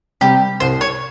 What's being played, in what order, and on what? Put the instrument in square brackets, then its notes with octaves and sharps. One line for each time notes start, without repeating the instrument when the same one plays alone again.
[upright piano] C3 G3 [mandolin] G4
[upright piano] C2 [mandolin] C5
[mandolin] C#5